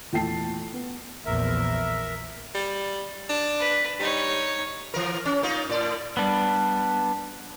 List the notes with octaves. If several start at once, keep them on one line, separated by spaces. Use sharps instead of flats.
E2 A#2 A3 G5 A5 C7
B3
A#1 E2 A#4 E5
G3
D4
B4
G3 D#4 C#5
E3 A#4
C#4
A#3 D#4 F4
A2 D5
G3 B3 D4